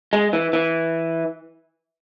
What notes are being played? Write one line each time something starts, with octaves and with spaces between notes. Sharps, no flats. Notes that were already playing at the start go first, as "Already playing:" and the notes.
G#3
E3
E3